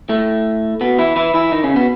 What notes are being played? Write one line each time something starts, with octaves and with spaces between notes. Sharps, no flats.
A2 A3
B2 B3
E3 E4
E3 E4
E3 E4
D#3 D#4
C#3 C#4
B2 B3